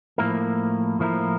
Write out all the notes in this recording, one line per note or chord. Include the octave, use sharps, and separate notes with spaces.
A2 F3 A#3 E4 A#4
A2 F3 A#3 E4 A#4